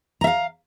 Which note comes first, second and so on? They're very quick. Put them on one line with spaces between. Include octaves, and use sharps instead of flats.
A#5 E5 F5